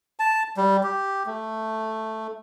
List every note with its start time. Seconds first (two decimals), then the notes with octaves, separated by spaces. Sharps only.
0.19 A5
0.57 G3
0.83 G4
1.26 A3